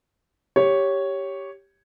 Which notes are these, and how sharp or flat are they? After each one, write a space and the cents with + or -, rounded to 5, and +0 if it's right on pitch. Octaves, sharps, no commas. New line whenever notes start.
G4 +0 C#5 +0